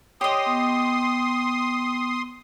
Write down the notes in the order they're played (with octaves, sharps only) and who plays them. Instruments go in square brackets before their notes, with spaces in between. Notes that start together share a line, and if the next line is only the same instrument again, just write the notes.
[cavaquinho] G4 D#5 [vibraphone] C#5 [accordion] C6 D#6
[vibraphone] B3